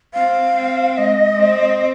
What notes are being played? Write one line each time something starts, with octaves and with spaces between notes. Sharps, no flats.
C4 F5
C4
G#3 D#5
C4